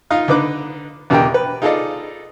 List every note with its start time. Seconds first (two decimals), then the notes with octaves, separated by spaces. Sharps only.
0.10 D#4 F4 D#5 F5
0.28 D3 D#4 B4 D6 F#6
1.10 E2 B2 D3 G4 A#4 G5
1.34 B4
1.62 D#4 F4 G#4 A4 D5 D#5